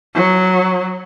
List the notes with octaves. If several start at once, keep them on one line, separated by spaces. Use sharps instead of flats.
F#3